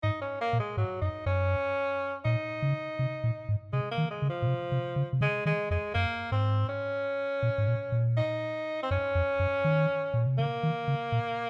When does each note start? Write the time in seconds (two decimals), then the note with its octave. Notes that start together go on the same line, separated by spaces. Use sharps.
0.03 G#2 D#4
0.21 C#4
0.41 A#3
0.53 A#2
0.59 G#3
0.77 G#2 F#3
1.01 F#2 D#4
1.26 F#2 C#4
2.25 A#2 D#4
2.62 C#3
2.99 C3
3.24 A#2
3.49 G#2
3.73 C3 G#3
3.91 A#3
3.98 D#3
4.11 G#3
4.22 C#3
4.29 F3
4.42 A#2
4.47 C3
4.72 C3
4.96 C#3
5.13 C3
5.21 C#3 G#3
5.46 D#3 G#3
5.71 F2 G#3
5.94 F#2 A#3
6.32 G#2 C4
6.69 C#4
7.43 A#2
7.58 G#2
7.68 A#2
7.92 A#2
8.17 D#4
8.83 C4
8.91 F#2 C#4
9.15 F2
9.39 F#2
9.64 D#3
10.14 A#2
10.26 C3
10.38 C#3 A#3
10.63 D#3
10.88 C#3
11.12 A#2